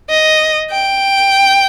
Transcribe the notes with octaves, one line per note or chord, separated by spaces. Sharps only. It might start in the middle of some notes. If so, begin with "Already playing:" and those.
D#5
G5